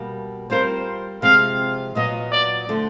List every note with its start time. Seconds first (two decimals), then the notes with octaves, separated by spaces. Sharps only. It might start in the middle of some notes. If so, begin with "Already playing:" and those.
Already playing: B2 G3 A#3
0.50 G3 C4 F4 A#4 C5
1.22 C3 F3 G#3 C4 F5
1.95 A#2 F#3 B3 D#5
2.32 D5
2.69 D3 F3 A3